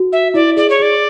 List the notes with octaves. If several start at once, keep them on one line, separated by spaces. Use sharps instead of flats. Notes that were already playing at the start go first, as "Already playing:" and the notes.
Already playing: F#4
E5
E4 D5
G#4 D5
C#5
G#4 D5